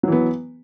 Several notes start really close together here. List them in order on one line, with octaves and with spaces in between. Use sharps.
F#3 E3 B3